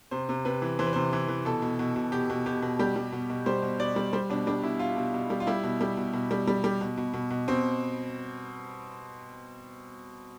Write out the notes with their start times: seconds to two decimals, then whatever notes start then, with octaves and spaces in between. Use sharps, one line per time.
0.11 C3 C5
0.29 C3
0.45 C3 B4
0.62 E3
0.79 E3 C5
0.86 B4
0.93 C3 C5
1.13 E3
1.28 E3
1.45 B2 A4
1.62 B2
1.79 B2
1.96 B2
2.12 B2 G4
2.30 B2
2.46 B2 G4
2.62 B2
2.79 G3 G4
2.96 G3
3.12 B2
3.30 B2
3.46 G3 C5
3.63 B2
3.80 B2 D5
3.96 G3
4.13 G3 C5
4.30 B2 D4
4.47 G3 D4
4.63 B2 E4
4.79 B2 F4
4.97 B2
5.14 B2
5.30 G3
5.40 F4
5.47 G3 E4
5.64 B2
5.81 G3
5.97 B2
6.13 B2
6.31 G3
6.48 G3
6.64 G3
6.81 B2
6.98 B2
7.14 B2
7.31 B2
7.48 B2 C4